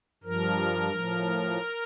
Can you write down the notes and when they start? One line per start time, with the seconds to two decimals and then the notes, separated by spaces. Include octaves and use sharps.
0.24 G2 F3 A#4
0.91 A2 F3